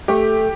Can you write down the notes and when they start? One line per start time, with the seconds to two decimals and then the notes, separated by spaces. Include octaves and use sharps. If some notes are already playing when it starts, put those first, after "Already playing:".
0.08 A3 G4